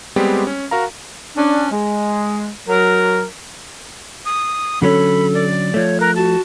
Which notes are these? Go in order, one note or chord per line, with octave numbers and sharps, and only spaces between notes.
G3 G#3 B3 C4 G4
C#4
F#4 A#4 F5 A#5
C#4 D4
G#3
F#3 A#4
D#6
D3 F#3 C#4 A4 B5
D5
F3 A3 C#5
A#4 F#6
F#4 A5